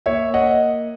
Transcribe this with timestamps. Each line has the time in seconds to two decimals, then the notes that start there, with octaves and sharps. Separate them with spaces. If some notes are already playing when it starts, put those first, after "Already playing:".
0.06 A#3 C#5 E5
0.34 D#5 F#5